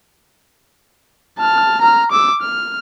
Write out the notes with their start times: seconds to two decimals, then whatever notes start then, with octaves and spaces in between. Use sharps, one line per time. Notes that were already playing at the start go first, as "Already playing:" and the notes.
1.38 A5 F6
1.81 A#5 F6
2.11 D6 E6
2.41 F6